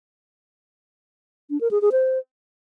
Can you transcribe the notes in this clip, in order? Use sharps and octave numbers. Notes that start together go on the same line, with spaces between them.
D4
A#4
G#4
G#4
C5